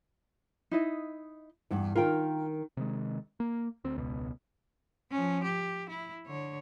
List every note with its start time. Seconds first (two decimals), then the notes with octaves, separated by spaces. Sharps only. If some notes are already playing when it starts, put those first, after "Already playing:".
0.71 D#4 E4 D#5
1.71 E2 G2
1.96 D#3 F4 A#4 G5
2.77 C3 D#3 G#3
3.40 A#3
3.84 D2 C4
3.98 E1 C#2 B2
5.11 F3 C#4
5.44 G4
5.89 E4
6.27 D3 C#5